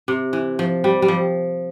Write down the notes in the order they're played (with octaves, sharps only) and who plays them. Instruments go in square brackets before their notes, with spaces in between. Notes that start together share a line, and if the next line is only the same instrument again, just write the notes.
[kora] C3
E3
F3
G3
G3
F3